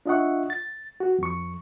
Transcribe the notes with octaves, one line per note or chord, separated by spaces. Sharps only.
D4 F4 D#5 E5 F#5 C#6
A6
F#4
F2 C#6